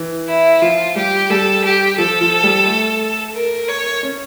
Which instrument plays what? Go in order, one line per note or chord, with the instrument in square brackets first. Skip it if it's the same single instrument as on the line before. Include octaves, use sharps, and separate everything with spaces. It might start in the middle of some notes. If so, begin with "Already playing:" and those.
Already playing: [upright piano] E3
[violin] E4
[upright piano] F3 [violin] F4
[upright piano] G3 [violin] G4
[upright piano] G3 [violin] A4
[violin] G4
[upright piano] F3 [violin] A4
[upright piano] F3
G3
A3
[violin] A#4
C#5
[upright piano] C#4